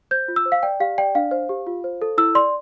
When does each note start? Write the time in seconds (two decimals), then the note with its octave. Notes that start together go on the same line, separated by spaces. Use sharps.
0.11 C5 G6
0.28 F4
0.36 E6
0.45 C5
0.52 F5
0.63 D5 G5
0.80 G4 F5
0.98 D5 G5
1.15 D4 F5
1.31 C5
1.49 G4
1.67 F4
1.84 C5
2.02 A4
2.18 E4 E6
2.35 D5 C6